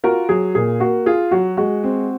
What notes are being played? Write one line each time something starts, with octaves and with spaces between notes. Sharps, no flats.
F4 F#4 A#4
F#3 G#4
A#2 G#4
A#3 F#4
F4 G#4
F#3 F#4
G#3 F#4
C4